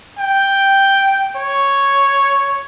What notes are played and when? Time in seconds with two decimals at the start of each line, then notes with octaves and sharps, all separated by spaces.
0.19 G5
1.36 C#5